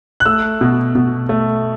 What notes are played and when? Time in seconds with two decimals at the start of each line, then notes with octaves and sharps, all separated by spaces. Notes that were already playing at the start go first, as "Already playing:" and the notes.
0.20 F#6
0.26 A3 E6
0.61 B2
0.95 B2
1.29 A3